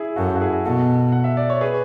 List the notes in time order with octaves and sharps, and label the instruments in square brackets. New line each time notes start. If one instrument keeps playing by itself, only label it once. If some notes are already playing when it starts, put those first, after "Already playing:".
Already playing: [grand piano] E4 G#4
[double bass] F#2 [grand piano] F#4 A4
[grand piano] F#4
E4 G#4
[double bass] B2 [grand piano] F#4 A4
[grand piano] F#5
E5
D5
C#5
G#4 B4